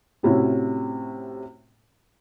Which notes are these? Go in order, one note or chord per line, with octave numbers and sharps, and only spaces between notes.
A2 C3 C#4 E4 F#4